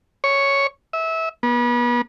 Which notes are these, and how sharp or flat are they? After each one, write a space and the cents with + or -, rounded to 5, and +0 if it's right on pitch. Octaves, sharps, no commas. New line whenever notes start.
C#5 +0
E5 -20
B3 -35